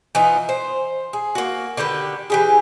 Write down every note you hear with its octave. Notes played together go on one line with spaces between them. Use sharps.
E3 B3 D#4 F4
C5
G#4
A#3 F#4
D3 D#3 G4 B4
E3 G4 G#4